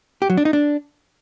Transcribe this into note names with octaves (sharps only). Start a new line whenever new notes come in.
G4
F#3
D4
D#4
D4